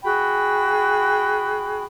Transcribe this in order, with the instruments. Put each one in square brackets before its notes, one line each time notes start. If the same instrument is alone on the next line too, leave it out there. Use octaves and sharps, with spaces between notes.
[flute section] F#4 G#4 G5 B5